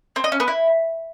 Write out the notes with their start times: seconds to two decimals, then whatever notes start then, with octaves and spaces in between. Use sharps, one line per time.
0.16 C4
0.24 D#5
0.32 C#4
0.40 B3
0.48 E4